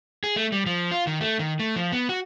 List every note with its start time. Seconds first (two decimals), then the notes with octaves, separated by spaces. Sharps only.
0.24 G#4
0.36 A3
0.52 G3
0.66 F3
0.91 F4
1.07 D#3
1.21 A3
1.39 D#3
1.60 A3
1.76 F3
1.92 B3
2.09 F#4